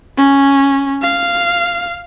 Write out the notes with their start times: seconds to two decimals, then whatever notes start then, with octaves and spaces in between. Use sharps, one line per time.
0.18 C#4
1.02 F5